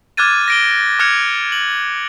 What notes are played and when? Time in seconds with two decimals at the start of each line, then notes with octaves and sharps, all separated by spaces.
0.17 D6 F6 F#6 G#6 A6 D#7
0.48 A#6 D7 G7
0.99 D6 F6 F#6 G#6 C#7 F7
1.52 F#7